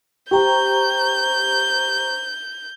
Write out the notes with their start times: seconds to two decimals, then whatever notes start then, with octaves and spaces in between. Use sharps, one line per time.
0.31 G4 C5 A#5 C#6 G6